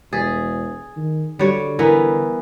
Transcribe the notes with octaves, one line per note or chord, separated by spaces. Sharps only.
E1 G#4 A6 B6
D#3
D3 G3 F#4 C#5
E3 B3 A#4